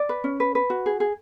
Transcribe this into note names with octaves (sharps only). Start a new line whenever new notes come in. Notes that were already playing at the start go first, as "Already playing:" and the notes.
Already playing: D5
B4
C#4
B4
B4
F#4
G#4
G#4